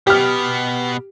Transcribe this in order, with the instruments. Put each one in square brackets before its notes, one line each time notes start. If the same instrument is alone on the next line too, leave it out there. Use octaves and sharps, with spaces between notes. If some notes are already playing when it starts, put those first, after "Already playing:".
[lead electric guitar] B2 B3 [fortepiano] G4 F6